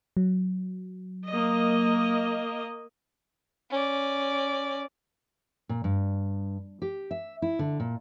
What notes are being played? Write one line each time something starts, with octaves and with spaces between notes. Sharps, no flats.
F#3
A#3 D#5
C#4 D5
A#2
G2
G4
E5
E4
D3
A#2